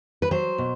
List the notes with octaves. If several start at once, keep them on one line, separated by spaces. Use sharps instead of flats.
B4
F#3 C5
B2